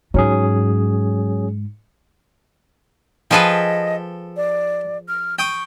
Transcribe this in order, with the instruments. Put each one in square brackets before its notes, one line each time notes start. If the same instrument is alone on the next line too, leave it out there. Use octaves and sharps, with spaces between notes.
[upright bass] G#2 [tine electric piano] F#3 C#4 G#4
[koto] F3 G#4 B4 [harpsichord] A4 G5 [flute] D#5
[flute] D5
F6
[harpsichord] G5 D#6 [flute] C#6